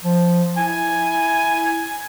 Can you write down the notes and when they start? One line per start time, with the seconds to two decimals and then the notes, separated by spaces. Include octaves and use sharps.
0.04 F3
0.57 E4 G#5